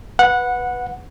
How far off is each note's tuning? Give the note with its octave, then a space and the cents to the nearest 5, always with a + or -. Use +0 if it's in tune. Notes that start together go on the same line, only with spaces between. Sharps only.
B4 +0 F#5 -15